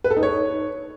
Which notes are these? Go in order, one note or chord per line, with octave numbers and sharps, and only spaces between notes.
B4
A4
D#4
C#5